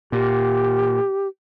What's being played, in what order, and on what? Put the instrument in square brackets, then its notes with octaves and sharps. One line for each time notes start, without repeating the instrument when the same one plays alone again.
[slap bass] A#2 [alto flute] G4